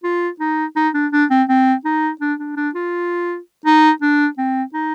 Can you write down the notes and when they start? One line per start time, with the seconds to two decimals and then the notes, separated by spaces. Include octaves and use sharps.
0.04 F4
0.40 D#4
0.76 D#4
0.94 D4
1.12 D4
1.30 C4
1.49 C4
1.85 D#4
2.21 D4
2.39 D4
2.56 D4
2.75 F4
3.66 D#4
4.02 D4
4.38 C4
4.74 D#4